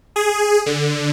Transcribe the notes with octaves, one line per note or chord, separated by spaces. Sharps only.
G#4
D3